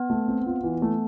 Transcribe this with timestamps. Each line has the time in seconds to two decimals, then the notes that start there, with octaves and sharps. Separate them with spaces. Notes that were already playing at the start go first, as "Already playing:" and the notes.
Already playing: B3
0.10 A3
0.28 C4
0.46 F4
0.64 E3
0.82 A3